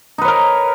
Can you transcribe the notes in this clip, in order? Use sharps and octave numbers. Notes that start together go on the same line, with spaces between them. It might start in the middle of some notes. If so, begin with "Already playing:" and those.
D#4 A#4 B4 C#5